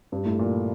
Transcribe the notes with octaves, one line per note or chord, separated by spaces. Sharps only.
G2
A2
A#2